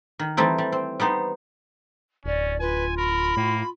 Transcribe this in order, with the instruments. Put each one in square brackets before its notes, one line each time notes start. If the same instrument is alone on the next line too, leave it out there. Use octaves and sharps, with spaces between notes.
[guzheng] D#3
E3 G3 A3 C4 D#4
G3
C4
G3 B3 D#4 C5
[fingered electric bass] D1 [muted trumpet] C#4 [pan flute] D5
[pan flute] F4 [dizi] B4 [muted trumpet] G#5
[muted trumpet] A#4 [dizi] B5
[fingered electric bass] A2 [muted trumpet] A#3